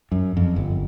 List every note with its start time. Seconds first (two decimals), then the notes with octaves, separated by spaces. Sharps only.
0.12 F#2
0.37 F2
0.56 G1